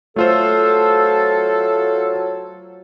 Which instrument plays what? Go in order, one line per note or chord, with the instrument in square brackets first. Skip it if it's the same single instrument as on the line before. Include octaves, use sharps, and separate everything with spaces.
[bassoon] F#3 [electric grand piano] A3 F4 C5 [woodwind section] A4